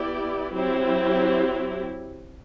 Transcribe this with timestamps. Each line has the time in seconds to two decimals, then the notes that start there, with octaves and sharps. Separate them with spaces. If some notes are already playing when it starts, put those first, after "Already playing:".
Already playing: B3 E4 G4 D5
0.53 F#3 C4 E4 G4